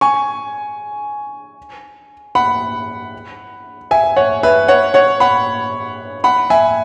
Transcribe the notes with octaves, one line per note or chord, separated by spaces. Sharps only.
G#5 C#6
F#5 B5
E5 G#5
C#5 F#5
B4 E5
C#5 F#5
C#5 F#5
F#5 B5
F#5 B5
E5 G#5